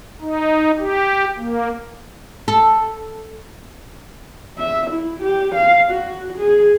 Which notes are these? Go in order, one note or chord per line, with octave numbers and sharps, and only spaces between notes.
D#4
G4
A#3
A4
E5
E4
G4
F5
F#4
G#4